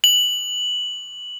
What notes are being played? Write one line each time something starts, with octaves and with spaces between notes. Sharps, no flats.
F#7